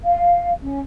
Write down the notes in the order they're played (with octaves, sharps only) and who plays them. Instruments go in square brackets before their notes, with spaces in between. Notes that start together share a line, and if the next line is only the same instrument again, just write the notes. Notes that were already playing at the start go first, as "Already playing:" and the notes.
[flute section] F5
C#4